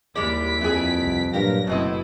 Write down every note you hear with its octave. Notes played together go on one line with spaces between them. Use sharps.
D#2 G3 G#3 E4 D5 B6 D7
F2 E3 G3 G#4
C2
G2 A#2 F#3 G4 A#4 F5 A#6
F#1 F#2 B2 A3 C4 E4 D#5